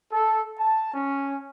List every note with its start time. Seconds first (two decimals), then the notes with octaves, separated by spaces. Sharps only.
0.12 A4
0.60 A5
0.94 C#4